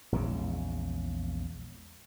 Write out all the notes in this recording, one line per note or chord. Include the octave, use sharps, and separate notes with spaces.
A#1 E2 C#3 G#3